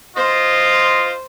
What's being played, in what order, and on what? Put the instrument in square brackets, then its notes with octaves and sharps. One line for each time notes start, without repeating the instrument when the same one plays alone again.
[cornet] F4 [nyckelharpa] C5 [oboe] D#5